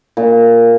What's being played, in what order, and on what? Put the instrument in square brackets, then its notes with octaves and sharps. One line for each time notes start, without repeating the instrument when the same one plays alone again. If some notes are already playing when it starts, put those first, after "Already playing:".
[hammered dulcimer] A#2